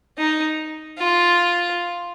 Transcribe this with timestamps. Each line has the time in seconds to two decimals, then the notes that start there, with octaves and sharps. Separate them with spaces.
0.18 D#4
0.98 F4